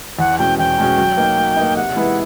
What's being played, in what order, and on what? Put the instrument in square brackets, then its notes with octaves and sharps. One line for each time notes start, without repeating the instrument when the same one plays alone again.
[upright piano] E2 [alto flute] F#5
[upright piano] B2 G#3 C#4 F#4 [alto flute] G5
[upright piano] E2 [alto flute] G5
[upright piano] B2 G#3 C#4 F#4
F#3
A#3 D#4
F#3
A#3 D#4
[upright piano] C3 [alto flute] F#5
[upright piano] E3 G#3 B3 E4